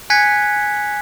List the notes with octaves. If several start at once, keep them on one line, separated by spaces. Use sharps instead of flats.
G#5 F#6 G#6 B6 C#7